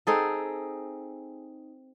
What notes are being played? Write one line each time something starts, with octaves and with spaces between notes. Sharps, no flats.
C4 D#4 G#4 A4